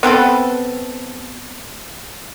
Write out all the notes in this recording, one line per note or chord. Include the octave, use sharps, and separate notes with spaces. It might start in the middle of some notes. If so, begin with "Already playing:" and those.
B3 C4 A4 B4